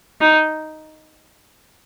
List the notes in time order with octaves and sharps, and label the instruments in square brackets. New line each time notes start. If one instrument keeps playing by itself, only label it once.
[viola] D#4